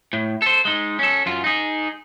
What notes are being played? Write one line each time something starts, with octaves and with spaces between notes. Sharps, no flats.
A2
A4 C5
G#3 D#4
C#4 A4
F#2 F4
D#4 G#4